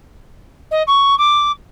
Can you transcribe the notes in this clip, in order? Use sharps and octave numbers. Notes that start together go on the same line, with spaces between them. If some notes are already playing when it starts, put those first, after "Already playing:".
D#5
C#6
D6